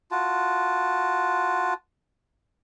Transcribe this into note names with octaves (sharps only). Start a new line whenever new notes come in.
F4 F#4 A5